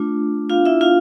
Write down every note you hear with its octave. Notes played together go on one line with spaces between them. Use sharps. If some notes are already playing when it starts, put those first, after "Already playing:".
Already playing: A3 D4 F4
B3 D4 F4 F5
E4 E5
F4 F5